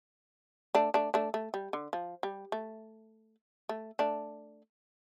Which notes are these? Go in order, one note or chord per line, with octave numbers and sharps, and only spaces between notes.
A3 D4
A3 D4
A3 D4
A3
G3
D3
F3
G3
A3
A3
A3 D4